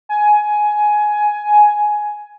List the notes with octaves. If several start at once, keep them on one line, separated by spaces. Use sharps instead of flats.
G#5